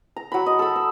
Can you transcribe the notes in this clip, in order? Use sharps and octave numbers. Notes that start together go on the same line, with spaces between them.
A#5
F#3 B5
D#5
A4 B5
E6